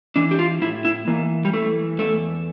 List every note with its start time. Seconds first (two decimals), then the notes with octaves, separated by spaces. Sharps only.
0.16 E3 D4
0.31 G4
0.39 F4
0.62 A2 E4
0.85 E4
1.08 E3 A#3
1.45 G3
1.53 E3 A3
1.99 E2 A3